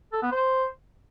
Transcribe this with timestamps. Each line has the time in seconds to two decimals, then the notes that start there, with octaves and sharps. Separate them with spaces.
0.13 A4
0.22 B3
0.32 C5